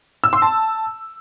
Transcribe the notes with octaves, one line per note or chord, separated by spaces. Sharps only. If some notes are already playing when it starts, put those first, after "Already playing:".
E6
C6
A5